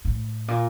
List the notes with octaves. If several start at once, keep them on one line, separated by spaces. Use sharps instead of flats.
A2
A#2